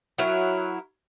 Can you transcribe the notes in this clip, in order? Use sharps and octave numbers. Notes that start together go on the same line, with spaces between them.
F#3 E4 A#4